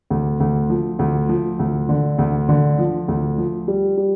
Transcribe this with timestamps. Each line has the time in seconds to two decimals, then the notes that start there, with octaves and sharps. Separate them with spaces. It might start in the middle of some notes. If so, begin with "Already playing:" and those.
0.10 D2
0.40 D2
0.70 F3
0.99 D2
1.29 F3
1.59 D2
1.89 D3
2.19 D2
2.49 D3
2.79 F3
3.08 D2
3.38 F3
3.68 G3
3.97 G3